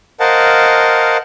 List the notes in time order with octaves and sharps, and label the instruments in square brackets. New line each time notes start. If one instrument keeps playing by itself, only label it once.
[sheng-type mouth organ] A#4 C5 D#5 F5 F#5 A5